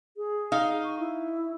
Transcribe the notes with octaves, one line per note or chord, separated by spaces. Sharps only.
G#4
D#4 F5
C#6
E4